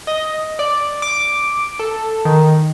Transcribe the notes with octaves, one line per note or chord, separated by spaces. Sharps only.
D#5
D5
D6
A4
D#3